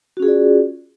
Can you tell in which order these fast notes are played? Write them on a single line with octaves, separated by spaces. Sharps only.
F#4 C#4 G#4 F4 D5